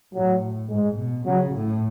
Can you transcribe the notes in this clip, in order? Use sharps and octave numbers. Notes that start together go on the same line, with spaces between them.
A2 F#3
G#2 G#3
B2
C#3 F#3
A2